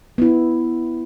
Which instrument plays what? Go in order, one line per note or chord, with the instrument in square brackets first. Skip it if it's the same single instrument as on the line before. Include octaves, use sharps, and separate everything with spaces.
[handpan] B3 E4